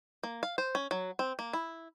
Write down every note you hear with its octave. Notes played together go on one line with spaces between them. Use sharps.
A#3
F5
C5
C#4
F#3
C4
A#3
E4